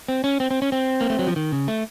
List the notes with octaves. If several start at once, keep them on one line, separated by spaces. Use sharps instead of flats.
C4
C#4
C4
C4
C#4
C4
A#3
A3
F#3
F3
D#3
C#3
A3